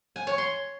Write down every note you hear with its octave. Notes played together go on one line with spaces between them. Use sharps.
G#5
C#5
C6